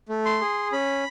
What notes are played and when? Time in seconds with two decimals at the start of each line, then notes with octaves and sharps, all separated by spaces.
0.09 A3
0.25 C6
0.41 G#4
0.72 C#4 B5